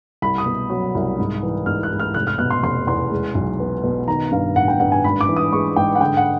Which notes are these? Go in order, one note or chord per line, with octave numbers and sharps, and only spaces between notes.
C2 B5
D#6
B2
F#3
C2
G#2
E3
G#2 F6
F#6
G#2
F6
F1 F#6
F6
B2 F#6
C6
F1 C6
E2 C6
G#3
B1
B3
B2
D#3 A#5
G2 F5
A1 F#5
G5
G2 F#5
G#5
G#1 B5
D6
E3
D#6
G#3 C#6
G#2 G5
F#5
D3 G5
F#5